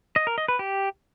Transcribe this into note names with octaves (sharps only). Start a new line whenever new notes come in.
D#5
A#4
D#5
B4
G4